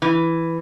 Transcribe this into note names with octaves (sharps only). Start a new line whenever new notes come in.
E3